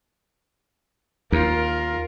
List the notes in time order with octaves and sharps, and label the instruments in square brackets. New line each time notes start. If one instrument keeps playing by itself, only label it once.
[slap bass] D#2 [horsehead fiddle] F4 A#4